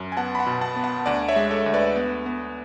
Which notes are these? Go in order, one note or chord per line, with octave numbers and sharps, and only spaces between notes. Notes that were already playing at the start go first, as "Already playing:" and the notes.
Already playing: F#2
G#5
B3 F#5 A5
B5
F#5 A5
B2
F#5 A5
B3
F#5 A5
D2 D5 F#5
C#5 E5
G#3
A4 C#5
D2
B4 D5
B3
B3